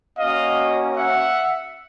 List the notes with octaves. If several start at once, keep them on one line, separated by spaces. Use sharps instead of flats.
A#3 C#4 F#4 D#5 F5
E5 F#5